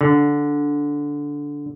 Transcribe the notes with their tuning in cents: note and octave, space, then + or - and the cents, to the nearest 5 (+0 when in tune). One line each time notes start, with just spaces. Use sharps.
D3 -10